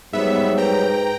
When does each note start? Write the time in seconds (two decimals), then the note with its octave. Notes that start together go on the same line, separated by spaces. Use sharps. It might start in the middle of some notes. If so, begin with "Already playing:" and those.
0.13 G#2 F#3 G3 B3 E5
0.58 B4 G5 A#5